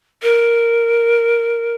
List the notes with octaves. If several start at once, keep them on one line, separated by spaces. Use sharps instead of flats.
A#4